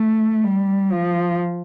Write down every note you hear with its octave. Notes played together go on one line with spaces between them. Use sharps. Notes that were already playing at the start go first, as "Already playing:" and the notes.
Already playing: A3
G3
F3